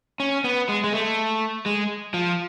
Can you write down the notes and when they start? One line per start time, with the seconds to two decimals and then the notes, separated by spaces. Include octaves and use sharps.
0.20 C#4
0.44 B3
0.69 G#3
0.84 G#3
0.93 A3
1.66 G#3
2.14 F3